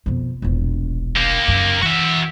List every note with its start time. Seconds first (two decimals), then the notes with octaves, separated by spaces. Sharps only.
0.06 F2 B2
0.42 E1 A#1
1.16 A#3 G4
1.48 F#2 C#3
1.82 E3 F#4 E5